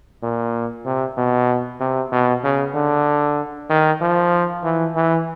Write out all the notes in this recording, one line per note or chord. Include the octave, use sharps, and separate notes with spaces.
A#2
C3
B2
C3
B2
C#3
D3
D#3
F3
E3
E3